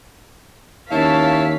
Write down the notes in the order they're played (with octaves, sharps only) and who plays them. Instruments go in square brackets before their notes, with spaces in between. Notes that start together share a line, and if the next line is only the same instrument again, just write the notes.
[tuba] D#2 [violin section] C#4 F5 B6 [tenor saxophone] E4 [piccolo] A5